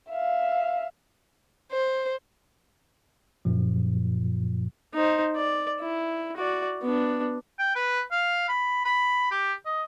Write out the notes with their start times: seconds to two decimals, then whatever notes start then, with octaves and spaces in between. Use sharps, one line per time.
0.10 E5 F5
1.72 C5
3.45 F#2 A#2 F3
4.94 D#4 C5
5.36 D5
5.80 E4
6.37 F#4 D5
6.82 B3 D4
7.59 G5
7.76 B4
8.12 F5
8.49 B5
8.85 B5
9.31 G4
9.66 D#5